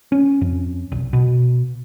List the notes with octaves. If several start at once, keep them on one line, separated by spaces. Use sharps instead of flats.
C#4
F2
B1
B2